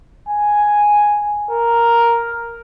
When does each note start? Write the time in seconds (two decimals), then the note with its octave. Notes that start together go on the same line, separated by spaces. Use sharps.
0.28 G#5
1.51 A#4